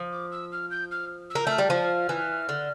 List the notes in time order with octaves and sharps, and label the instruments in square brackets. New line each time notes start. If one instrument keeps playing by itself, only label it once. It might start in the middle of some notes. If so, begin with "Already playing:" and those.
Already playing: [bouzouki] F3
[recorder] D6
E6
F6
G6
F6
E6
[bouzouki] A#3
[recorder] G6
[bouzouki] A3 [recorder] F6
[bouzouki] G3
F3
E3
D3